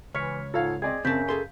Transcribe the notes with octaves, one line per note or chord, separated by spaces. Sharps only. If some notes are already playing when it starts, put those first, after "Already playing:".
C#2 E3 C#5 F6 B6 C#7
G#2 F4 A4 C#5 F5 G#6
C4 G#4 D5 D#5 G#6
F#2 C#3 C4 A5 G6 B6
G#4 A4 C6